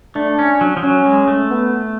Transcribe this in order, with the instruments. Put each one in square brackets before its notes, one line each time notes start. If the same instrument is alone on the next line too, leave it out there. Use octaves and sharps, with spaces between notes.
[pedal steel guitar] A3 [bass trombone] D4
[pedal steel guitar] C#4
F#3
F3
[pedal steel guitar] F#3 [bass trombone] C#4
[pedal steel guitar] G#3
A3
[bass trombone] B3